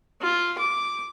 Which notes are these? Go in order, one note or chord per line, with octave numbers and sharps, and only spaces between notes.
F4
D6